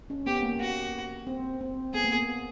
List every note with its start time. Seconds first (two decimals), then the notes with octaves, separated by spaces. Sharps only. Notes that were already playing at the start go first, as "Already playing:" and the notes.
0.10 C#4
0.26 B3 G4
0.43 A#3
0.60 F#4
1.27 C4
1.61 C4
1.94 B3 G#4
2.04 A#3
2.14 B3